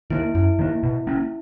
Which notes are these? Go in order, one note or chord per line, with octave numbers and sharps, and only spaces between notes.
D#3 A#3 E4
F#2 E4
D#3 A#3
B2
A#3 C#4